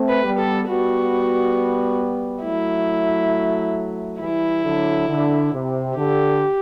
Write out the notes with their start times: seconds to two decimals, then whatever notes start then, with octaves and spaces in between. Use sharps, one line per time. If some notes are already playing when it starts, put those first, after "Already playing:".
Already playing: A3 C4
0.09 B4
0.24 G3 B3
0.39 A4
0.67 G3 B3 F#4
2.44 F#3 A3 E4
4.20 E3 G3 E4
4.64 D3 F#3
5.09 D3
5.53 C3
5.97 D3 G4